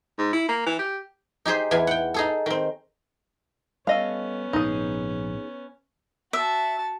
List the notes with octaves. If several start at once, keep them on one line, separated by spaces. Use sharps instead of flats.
G#2
E4
A#3
E3
G4
D#4 G4 G#4 C5
E2 E3 G#5
F#5 G5
D#4 G#4 A4
D#3 C4
G3 B3 C#4 A4 D#5 F5
A#1 G#2 C#3 D#4 G#4
F#4 E5 A5